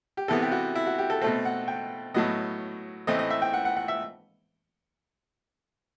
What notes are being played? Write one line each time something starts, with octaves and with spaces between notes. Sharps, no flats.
G4
C3 E3 B3 A4
G4
F#4
E4
F#4
G4
A4
B2 A3 C4 A4
F#5
G5
A2 F#3 B3 D#5
A2 E3 A3 C4 D#5
D#5
E5
G5
F#5
F#5
F#5
E5